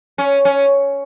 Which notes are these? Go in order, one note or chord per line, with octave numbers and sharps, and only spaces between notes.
C#4
C#4